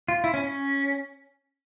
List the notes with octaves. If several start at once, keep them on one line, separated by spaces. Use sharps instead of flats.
F4
E4
C#4
C#4